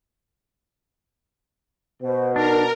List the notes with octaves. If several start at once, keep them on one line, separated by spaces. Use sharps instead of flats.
B2 C5
D4 D#4 A#4